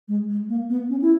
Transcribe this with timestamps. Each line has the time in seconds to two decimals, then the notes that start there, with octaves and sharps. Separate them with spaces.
0.08 G#3
0.29 G#3
0.49 A#3
0.70 B3
0.89 C#4
1.02 E4